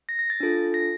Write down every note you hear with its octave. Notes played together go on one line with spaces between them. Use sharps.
A#6
A#6
A6
D4 F4 A4
A#6